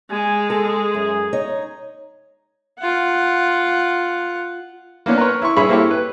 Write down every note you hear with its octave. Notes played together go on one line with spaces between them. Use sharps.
G#3 G#5
G#4 A4
F#2
D#4 C#5 D#5
F4 F#5
A#3 B3 C#4 D4
A#4 B4 C#5
E4 C#6
G2 G#4 C#5 E5 B5
A#3 C4 E4 G4 A4 C#5
B4